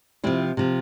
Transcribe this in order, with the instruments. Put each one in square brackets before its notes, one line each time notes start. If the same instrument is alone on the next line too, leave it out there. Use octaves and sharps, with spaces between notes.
[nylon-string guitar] C3 F3 C4 E4
C3 F3